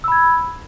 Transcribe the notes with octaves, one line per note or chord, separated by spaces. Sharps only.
B5 E6 G#6